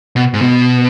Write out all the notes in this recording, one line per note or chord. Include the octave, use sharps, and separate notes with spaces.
B2
G#2
B2